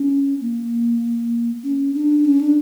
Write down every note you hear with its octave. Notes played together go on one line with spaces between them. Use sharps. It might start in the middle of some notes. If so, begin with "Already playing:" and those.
Already playing: C#4
A#3
C#4
D4
C#4
D4